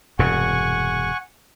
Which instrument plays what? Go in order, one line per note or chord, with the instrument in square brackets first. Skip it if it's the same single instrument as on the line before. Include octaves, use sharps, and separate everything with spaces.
[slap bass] E1 G2 C3 [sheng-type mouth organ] F#5 G#5 C#6